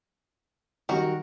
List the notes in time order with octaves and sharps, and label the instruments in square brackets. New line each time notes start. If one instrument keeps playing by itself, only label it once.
[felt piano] D#3 F#3 G3 [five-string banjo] F#4 A#4